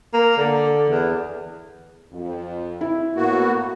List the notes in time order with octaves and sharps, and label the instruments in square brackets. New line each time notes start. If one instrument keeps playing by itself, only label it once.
[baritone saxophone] A#3
D3
E2
[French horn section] F2
[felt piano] E4
[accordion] A2 F#4 [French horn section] A#3 B3